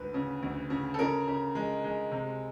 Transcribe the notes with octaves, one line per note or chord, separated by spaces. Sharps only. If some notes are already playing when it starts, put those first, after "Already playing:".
Already playing: D2 G#2 B4
C#3
D2
C#3
A4
C#3 A#4
C#3
G#3
G#3
C3